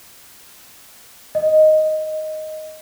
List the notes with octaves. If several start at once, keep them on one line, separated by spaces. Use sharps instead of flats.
D#5